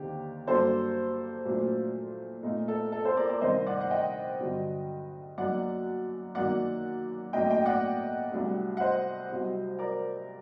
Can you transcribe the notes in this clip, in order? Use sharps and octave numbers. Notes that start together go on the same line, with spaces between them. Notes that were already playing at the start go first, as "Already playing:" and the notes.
Already playing: D#2 D3 C4 D#4 G4
G2 F#3 A#3 D4 A4 C5
A#2 F#3 A3 D4
A#2 A3 D#4
A4
A4
A4 C5
A#4 D5
A#4 D5
C2 C3 D#3 C5 D#5
D5 F#5
F#5
D#5 G5
G2 D3 F#3
F#2 F#3 A#3 D#4 D5 F#5
F#2 D#3 F#3 A#3 D5 F#5
A2 F#3 A#3 D4 D#5 G5
D#5 G5
D5 F#5
C2 C3 F#3 A3 D4
F#5
C5 D#5
C2 C3 F#3
A#4 D5